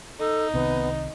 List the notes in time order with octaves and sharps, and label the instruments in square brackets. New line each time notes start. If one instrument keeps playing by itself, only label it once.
[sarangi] D#4 [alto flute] A4
[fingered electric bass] C2 C3 D#3 [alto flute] B3